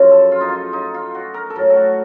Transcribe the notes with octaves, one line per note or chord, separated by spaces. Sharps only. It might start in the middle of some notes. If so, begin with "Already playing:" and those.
Already playing: F#2 C#3 F3 D#4
A4
F4
D#4
F4
D#4
F4
F#4
A#4
A4
A2 F#3 A#4
A4
F#4